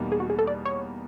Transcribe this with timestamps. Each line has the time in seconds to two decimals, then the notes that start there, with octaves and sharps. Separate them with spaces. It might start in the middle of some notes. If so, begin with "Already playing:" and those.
Already playing: E2 B2 G3 A#3 D#4
0.12 G#4
0.20 F#4
0.30 G#4
0.39 A4
0.47 D5
0.65 C#5